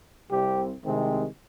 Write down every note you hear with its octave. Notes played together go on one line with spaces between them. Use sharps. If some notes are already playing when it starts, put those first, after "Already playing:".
C2 C3 G3 C4 G4
C2 C3 D#3 G#3 C4